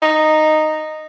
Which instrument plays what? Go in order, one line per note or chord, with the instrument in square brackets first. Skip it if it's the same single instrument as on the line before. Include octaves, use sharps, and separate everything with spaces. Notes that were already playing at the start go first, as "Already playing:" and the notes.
[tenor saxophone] D#4